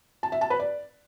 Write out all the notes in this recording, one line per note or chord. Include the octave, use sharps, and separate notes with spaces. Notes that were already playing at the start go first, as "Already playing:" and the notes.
A5
E5
A5
B4
D5